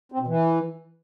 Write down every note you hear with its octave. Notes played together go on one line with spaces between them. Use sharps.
C4
B2
E3